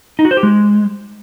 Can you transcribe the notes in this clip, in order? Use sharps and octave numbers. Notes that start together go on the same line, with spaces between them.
D#4
F#4
C5
G4
G#3